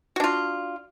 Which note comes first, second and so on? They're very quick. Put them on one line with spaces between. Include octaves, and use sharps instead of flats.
F#4 D4 F4